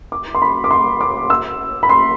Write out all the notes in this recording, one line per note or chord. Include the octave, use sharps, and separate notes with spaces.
D6
C6
B5
D6
C6
D6
E6
B5
C6